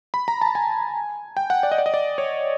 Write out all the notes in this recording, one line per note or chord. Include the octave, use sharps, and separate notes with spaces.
B5
A#5
A5
G#5
G5
F#5
D5
D#5
D5
D#5
D5
C#5